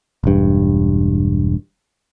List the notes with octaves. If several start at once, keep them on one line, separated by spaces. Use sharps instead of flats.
E1 G2